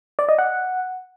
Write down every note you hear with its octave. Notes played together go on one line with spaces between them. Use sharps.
D5
D#5
F#5